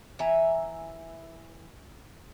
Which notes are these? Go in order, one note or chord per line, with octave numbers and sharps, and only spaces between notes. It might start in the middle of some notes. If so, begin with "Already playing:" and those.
E3 E5 G#5 A#5